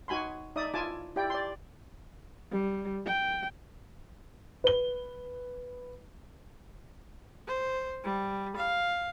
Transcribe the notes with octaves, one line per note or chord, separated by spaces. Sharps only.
D#4 F#4 G#5 B5 C6
D#4 D5 E5 D#6
E4 F4 G#5 A5 D6
E4 G4 D5 G5
D5 C6
G3
G5
B4 G7
C5
G3
F5